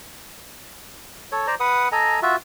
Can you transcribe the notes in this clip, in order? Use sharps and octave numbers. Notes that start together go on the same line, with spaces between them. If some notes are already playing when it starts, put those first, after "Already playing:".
A4 C#5
C5 D5 A#5
B4 F#5 D#6
A4 D#5 G#5 A#5
F4 F#4 E5